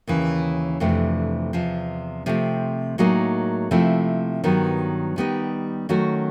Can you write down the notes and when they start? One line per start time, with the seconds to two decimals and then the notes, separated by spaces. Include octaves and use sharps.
0.07 D#2 C#3 E3
0.80 F2 C3 E3 A3 D4
1.53 E2 C3 F3
2.26 C3 F3 A3 C4
2.98 A2 F#3 A#3 D#4 G#4
3.71 C3 F3 A3 C4 E4
4.44 G2 D#3 F#3 B3
5.16 D#3 G3 B3 D#4
5.89 D#3 F#3 A3 C#4 F#4